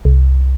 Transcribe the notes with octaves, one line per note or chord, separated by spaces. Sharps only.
C2